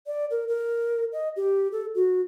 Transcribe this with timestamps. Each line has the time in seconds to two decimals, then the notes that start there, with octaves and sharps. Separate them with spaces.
0.07 D5
0.31 A#4
0.48 A#4
1.13 D#5
1.36 G4
1.72 A4
1.95 F#4